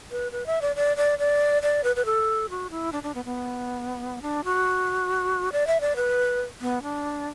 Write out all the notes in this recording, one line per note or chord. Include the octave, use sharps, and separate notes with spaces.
B4
B4
E5
D5
D5
D5
D5
D5
B4
B4
A4
F#4
E4
D4
D4
B3
B3
D4
F#4
D5
E5
D5
B4
B3
D4